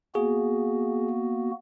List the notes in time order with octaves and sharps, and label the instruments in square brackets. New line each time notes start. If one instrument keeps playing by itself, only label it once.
[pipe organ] A#3 B3 F#4 [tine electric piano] G#4